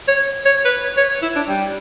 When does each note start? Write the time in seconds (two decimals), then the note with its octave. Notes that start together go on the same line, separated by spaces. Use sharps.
0.08 C#5
0.45 C#5
0.65 B4
0.97 C#5
1.22 E4
1.36 D4
1.49 G3